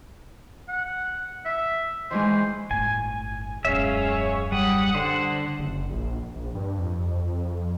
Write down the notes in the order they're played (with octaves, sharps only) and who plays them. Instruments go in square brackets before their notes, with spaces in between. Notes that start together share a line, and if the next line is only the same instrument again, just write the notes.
[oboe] F#5
E5
[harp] D#3 E3 G#3 [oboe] C5
[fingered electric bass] G1 A2 [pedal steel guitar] G#5
[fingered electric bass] D#1 F#2 [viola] G#3 C#4 [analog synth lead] C#5 [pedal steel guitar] E5 F5
[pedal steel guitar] G3 [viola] F#5 [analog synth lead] D#6
[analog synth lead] D3 [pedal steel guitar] C5
[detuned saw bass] F#1
A#1
A#1
G2
F2